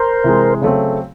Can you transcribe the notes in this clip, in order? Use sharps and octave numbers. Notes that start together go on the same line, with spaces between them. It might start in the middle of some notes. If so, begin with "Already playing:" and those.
Already playing: A#4 C5
C3 E3 G#3
C#3 F#3 A3 C4